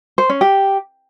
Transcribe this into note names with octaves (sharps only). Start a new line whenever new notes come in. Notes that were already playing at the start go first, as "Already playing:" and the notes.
C5
C#4
G4